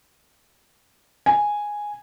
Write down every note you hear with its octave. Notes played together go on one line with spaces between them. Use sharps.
G#5